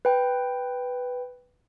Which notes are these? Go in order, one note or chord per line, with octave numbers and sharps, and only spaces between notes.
B4 G5